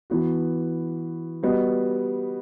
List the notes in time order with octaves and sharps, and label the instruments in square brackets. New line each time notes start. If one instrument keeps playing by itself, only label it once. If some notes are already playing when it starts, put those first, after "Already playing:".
[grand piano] E3 B3 F#4
G3 B3 F#4 B4 D#5